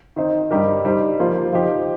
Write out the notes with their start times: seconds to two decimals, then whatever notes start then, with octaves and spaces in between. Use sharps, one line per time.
0.16 D#3 C4 D#4
0.51 G2 G3 D#4 G4 A#4
0.85 G3 D#4 C5
1.20 F3 A#3 F4 C5
1.53 F3 D#4 G4